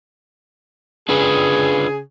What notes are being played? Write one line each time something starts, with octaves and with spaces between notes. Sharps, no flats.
C#3 D4 F4 G#4 B4